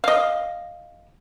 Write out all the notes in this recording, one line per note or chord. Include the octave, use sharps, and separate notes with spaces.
D#5 F5